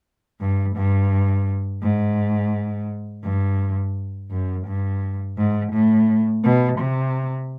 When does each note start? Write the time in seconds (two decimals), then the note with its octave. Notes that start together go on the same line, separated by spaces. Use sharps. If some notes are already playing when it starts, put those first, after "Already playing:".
0.41 G2
0.76 G2
1.83 G#2
3.24 G2
4.31 F#2
4.67 G2
5.38 G#2
5.73 A2
6.44 B2
6.79 C3